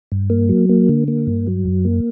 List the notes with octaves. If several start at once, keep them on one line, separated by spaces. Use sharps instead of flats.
G2
A#3
F#3
A#3
D3
A#3
G2
F#3
F#2
A#3